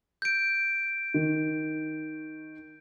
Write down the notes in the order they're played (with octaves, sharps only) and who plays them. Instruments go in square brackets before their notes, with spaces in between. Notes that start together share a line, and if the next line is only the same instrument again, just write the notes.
[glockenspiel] G6 D7
[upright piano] D#3